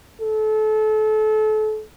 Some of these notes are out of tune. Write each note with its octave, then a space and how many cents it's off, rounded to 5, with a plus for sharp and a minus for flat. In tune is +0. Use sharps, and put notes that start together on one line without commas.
A4 -30